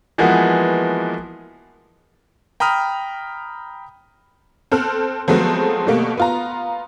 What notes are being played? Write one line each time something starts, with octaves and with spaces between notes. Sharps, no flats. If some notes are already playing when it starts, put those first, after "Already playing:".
E3 F3 G#3 A#3 B3 F#4
G5 A#5 B5 D#6 F6
C4 A4 F6 F#6
F3 F#3 G#3 A3 B3 C4
B2 G3 A3 A#3
B3 F4 A#5